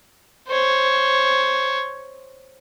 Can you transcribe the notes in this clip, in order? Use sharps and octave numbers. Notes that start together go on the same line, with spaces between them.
C5 C#5